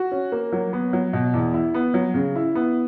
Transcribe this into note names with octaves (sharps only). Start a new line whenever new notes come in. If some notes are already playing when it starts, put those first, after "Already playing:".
Already playing: F#4
C#4
A#3
F#3
B3
F#3
B2
E2
E4
B3
F#3
C#3
E4
B3